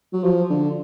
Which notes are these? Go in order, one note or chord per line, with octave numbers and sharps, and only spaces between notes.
F#3
F3
D3